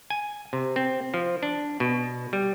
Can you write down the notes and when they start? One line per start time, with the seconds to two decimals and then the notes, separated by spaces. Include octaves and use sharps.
0.10 G#5
0.53 C3
0.76 C4
1.14 F3
1.43 D4
1.80 B2
2.33 G3